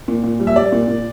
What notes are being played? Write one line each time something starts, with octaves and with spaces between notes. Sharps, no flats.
A#2
A#2
G3
E5
G3 D5
A#2
A#2